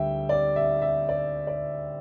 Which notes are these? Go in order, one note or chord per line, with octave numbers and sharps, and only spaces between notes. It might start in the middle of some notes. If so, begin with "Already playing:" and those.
Already playing: D2 G3 E5 G5
D5
E5
E5
D5
D5